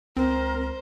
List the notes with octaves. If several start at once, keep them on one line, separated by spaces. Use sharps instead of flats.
C#2 C4 A#4 C5